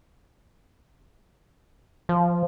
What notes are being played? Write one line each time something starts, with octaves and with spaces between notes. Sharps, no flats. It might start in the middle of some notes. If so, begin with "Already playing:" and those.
F3